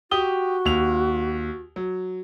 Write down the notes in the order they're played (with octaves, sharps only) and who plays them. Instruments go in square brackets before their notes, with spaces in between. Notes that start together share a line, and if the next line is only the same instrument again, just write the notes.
[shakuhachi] F#4 [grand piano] G4 D#6 G7
[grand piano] D#2 F7
F#3